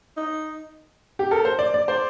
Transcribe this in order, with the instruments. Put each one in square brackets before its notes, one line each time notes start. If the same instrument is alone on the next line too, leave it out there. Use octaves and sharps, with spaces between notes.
[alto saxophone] D#4
[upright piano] G4
[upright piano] A4 [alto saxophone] A#4
[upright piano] C5
D5
D5
[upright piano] C5 [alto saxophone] D5